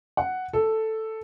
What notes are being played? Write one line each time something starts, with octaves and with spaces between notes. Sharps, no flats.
F#5
A4